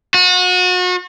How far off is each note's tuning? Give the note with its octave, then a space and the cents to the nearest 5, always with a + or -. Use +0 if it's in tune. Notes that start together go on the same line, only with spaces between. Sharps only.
F#4 -35